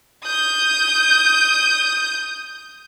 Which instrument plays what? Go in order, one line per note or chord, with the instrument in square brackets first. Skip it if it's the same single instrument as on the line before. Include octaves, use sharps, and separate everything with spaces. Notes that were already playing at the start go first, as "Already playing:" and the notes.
[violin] D#6 G6